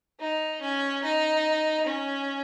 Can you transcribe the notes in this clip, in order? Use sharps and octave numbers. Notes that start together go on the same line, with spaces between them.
D#4
C#4
D#4
C#4